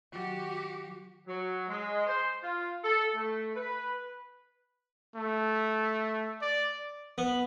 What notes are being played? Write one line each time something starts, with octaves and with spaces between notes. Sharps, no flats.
D#3 F#3 F#4 G4
F#3
G#3
C5
F4
A4
A3
B4
A3
D5
B3